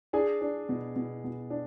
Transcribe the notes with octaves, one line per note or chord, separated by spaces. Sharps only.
D4 G#4 G#5
D4
B2
B2
B2
D4